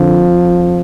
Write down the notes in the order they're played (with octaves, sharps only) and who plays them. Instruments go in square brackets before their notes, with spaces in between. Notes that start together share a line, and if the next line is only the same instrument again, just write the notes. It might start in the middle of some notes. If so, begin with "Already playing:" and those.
Already playing: [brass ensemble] F2 D3 F3